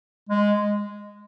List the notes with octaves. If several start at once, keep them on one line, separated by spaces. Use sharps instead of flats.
G#3